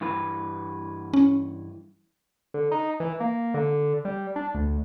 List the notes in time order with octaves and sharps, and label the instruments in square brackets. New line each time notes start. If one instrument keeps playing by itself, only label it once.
[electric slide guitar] G2 E3 B4
[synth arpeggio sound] C#4
[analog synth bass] D3
D#4
E3
A#3
D3
G3
D4
D2